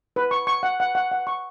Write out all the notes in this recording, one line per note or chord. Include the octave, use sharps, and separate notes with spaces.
B4
C#6
C#6
F#5
F#5
F#5
F#5
C#6